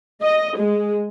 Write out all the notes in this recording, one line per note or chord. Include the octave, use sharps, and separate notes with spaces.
D#5
G#3